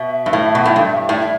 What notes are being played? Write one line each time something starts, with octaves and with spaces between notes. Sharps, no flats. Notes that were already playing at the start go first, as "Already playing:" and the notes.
Already playing: B2 E5
G2
A2
B2
A2
G2
A2 D5
E5